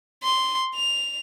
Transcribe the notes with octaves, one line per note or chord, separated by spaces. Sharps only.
C6
F7